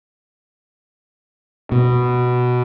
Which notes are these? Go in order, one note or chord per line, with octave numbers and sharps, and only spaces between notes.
B2